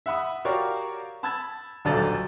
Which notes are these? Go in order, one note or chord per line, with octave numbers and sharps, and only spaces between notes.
E5 F#5 B5 D#6
F#4 G4 A#4 C#5 D5 F5
A5 B5 E6 G#6 A6
D#1 B1 D4 A4 A#5 A6